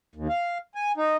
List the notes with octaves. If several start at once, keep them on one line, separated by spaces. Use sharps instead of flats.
D#2
F5
G#5
D#4